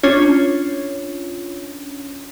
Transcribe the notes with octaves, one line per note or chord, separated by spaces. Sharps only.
C#4 D4 F4 C#5